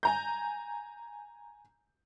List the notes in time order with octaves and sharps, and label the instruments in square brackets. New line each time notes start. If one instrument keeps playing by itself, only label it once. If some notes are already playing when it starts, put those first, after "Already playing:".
[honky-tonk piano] G#5 A#5 G6